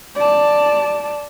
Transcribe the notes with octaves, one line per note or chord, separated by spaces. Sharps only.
D5 A5